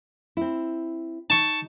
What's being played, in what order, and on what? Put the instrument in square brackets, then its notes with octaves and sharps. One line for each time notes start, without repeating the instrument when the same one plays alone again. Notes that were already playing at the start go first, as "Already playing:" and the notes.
[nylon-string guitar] C4 E4
[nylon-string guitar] D#4 [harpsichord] A5 C#6